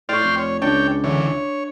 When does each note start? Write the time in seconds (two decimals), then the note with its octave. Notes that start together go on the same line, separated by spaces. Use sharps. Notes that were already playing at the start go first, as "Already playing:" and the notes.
0.09 A2 D5 G5 C6 C#6 F6
0.23 F1
0.38 C#5
0.62 C#2 D4 C#5 G5
1.04 D3 E3 C#5
1.27 C#5